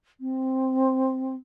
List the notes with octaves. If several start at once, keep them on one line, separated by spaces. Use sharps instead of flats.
C4